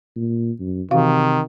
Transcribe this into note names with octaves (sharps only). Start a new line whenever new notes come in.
A#2
F#2
C3 D#3 E3 F#4 F5